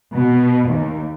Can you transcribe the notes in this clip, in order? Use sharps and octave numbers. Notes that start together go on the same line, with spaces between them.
B2
D#2